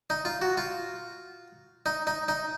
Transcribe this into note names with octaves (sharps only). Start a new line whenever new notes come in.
D#4
F4
F#4
F4
D#4
D#4
D#4